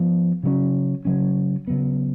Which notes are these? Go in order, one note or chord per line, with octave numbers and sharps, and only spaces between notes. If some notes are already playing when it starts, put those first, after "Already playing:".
Already playing: F3 B3
C#3 F#3 C#4
C#3 F#3 C#4
C#3 F#3 B3